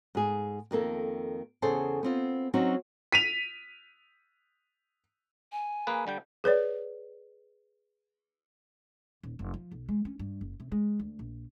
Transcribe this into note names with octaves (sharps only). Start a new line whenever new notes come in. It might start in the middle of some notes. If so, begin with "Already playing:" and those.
G#2 G#4
F2 D#3 A#3 A4
E2 C#3 G#4 A4 C5 A5
B3 C4 F4
F#3 C4 C#4 D#4 F#4
B6 D#7 F7
G#5
A#3 G#4 B4
D3 G3 G5
G#4 B4 C#5 D5
D#1
F1
F3
B1
G#3
C#4
G2
F#1
C3
G#3
D2
A#1